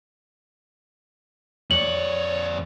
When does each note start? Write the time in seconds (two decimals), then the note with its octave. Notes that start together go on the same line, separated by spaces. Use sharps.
1.71 F2 C#5 D5 F#7